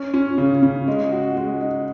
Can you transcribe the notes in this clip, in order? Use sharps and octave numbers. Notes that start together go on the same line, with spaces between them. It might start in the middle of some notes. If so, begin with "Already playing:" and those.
Already playing: C#4
C#4
C#3
C#3
G#3
F#4
G#3
D#4